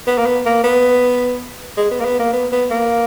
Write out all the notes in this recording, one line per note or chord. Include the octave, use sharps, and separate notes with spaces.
B3
A#3
B3
A#3
B3
G#3
B3
A#3
B3
A#3
B3
B3
A#3